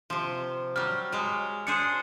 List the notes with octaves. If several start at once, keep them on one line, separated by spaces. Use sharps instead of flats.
C3 F3
F#3 G3 F6
F#3 G#3
D4 G#4 C5 C#7